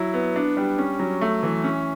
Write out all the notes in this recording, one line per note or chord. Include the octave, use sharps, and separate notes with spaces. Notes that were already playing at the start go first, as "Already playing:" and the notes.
Already playing: F#3 E4
B3
D4
G3
C#4
F#3
A3
E3
C#4